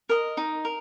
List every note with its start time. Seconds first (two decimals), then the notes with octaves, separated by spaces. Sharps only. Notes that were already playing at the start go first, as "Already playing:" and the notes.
0.09 A#4 D#5
0.37 D#4
0.65 A#4